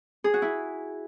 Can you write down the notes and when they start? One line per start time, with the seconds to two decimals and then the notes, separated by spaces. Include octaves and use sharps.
0.24 G#4
0.34 F#4
0.42 E4